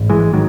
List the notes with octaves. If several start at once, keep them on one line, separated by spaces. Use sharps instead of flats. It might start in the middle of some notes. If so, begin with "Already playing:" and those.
Already playing: A1 G#2
E3 G#3
D#3 F#3